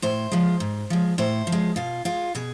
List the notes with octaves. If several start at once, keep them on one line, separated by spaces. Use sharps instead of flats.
A2 C5
F3 G#3
G#2
F3 G#3
A2 C5
F3
G#3
B2 F4
G#3 F4
B2 G#4